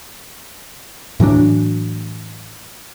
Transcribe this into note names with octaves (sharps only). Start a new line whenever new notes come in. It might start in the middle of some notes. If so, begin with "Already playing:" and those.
A2 E3 F#3 D4